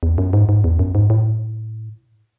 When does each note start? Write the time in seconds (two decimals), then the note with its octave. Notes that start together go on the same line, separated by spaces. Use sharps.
0.03 E2
0.18 F#2
0.33 G#2
0.49 G#2
0.64 E2
0.79 F#2
0.95 G#2
1.10 A2